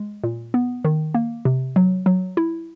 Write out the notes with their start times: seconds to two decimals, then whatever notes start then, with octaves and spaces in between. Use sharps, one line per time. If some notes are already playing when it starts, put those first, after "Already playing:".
Already playing: G#3
0.24 A#2
0.54 B3
0.85 D#3
1.15 A#3
1.45 C3
1.76 F#3
2.06 F#3
2.37 E4